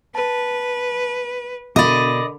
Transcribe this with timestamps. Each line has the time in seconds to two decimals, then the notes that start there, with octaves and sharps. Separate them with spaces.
0.15 B4 A5
1.76 B2 D3 A#4 D5 D#5 B5 D6